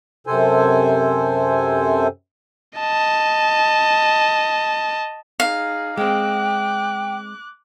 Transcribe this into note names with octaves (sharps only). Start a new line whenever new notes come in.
F#2 C3 A4 C5 G#5
D#5 A5
D#4 G#4 F5
G#3 C4 G5 D6 F#6